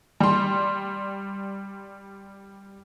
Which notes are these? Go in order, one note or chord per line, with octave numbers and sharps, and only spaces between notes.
G3 C6